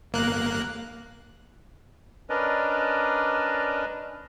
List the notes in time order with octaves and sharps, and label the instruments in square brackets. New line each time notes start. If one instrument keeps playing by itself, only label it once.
[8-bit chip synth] G1 A#3 F#6
[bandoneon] C#4 D4 A#4 B4 D5 D#5